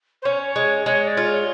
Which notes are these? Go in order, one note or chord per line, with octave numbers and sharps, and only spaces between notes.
C5
C#4 C#5
G#3
G#3 C#5
D5
F4
C#5